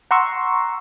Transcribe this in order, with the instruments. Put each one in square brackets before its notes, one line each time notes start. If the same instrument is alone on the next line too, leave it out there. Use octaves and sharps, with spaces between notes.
[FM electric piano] F#5 A#5 C6 C#6 E6